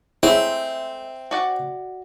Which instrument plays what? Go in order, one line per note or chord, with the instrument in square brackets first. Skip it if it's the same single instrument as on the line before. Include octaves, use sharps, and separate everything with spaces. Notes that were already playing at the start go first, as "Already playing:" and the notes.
[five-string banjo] G#3 A3 [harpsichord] C4 [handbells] E4 G#4 C#5 [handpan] E5
[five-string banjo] F#4 D5 F#5